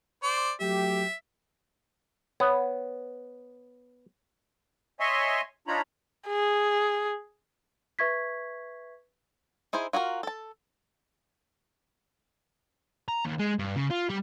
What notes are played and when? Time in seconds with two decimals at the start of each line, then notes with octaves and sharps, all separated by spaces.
0.24 C5 D5
0.60 F#3 A3 G4 E5
2.40 B3 C#5
5.00 C#5 D#5 E5 G#5 C6 C#6
5.68 D4 D#4 F4 C#5 A#5 B5
6.28 G#4
7.99 B4 E5 C#6 G#6 B6
9.73 D#4 E4 G#4 C5
9.93 F4 F#4 G#4 A#4
10.23 A4 A5
13.09 A#5
13.25 D#2
13.40 G#3
13.59 G2
13.76 C#3
13.90 F4
14.09 G3